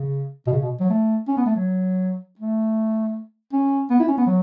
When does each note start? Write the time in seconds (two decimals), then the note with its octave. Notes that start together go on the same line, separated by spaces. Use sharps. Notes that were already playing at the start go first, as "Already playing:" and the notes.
Already playing: C#3
0.47 B2
0.53 C#3
0.62 B2
0.80 F#3
0.90 A3
1.28 C#4
1.37 B3
1.46 A3
1.56 F#3
2.39 A3
3.53 C#4
3.90 B3
4.00 E4
4.08 C#4
4.18 B3
4.27 F#3